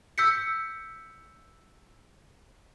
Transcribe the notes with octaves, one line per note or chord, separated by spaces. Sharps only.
E6 G6 B6 C#7